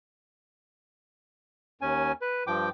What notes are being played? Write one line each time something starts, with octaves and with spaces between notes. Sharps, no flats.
D#2 C#4 G#5
B4
G2 F3 G5 D6